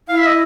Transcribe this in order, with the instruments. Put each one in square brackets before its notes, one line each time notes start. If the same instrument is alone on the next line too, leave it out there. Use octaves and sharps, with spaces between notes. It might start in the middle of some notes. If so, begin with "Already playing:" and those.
[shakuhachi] E4 [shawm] F5
[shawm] E5
D#5